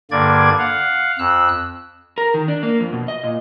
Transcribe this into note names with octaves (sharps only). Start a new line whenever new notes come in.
G2 D3 A#3 D5 G#6
F5 F#5
F2 E6 F#6
A#4
D#3
D4
A#3
F2
B2
D#5
A#2